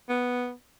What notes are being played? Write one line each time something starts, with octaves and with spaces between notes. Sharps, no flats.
B3